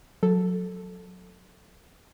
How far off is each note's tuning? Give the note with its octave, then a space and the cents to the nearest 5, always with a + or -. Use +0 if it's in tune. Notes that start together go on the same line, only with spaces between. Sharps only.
F#3 -25 A4 +0